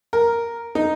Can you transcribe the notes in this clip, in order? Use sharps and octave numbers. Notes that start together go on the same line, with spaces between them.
A#4
D#4